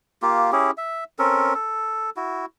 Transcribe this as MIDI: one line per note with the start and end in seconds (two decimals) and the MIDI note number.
0.22 0.51 58
0.22 0.51 65
0.22 0.51 67
0.52 0.71 61
0.52 0.71 64
0.52 0.71 67
0.52 0.71 68
0.78 1.04 76
1.19 1.54 60
1.19 1.54 61
1.19 1.54 69
1.19 1.54 70
1.54 2.10 69
2.17 2.46 64
2.17 2.46 66